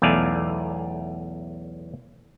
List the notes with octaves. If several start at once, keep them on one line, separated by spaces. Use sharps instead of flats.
B1 E2 A3 D5 F5 G#5